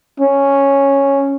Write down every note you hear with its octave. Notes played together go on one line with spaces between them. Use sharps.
C#4